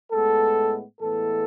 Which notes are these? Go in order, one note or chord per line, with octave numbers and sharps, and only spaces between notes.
A2 G#3 B3 A4
A2 E3 G#3 B3 A4